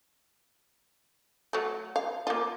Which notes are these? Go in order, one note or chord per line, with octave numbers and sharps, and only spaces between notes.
F#3 A3
F5
A#3 F4